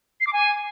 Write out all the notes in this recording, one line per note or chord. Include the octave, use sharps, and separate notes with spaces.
C7
D6
G#5